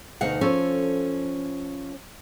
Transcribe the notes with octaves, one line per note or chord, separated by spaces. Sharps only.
D2 B2 D#4 F5 F#5
F3 C#4 A4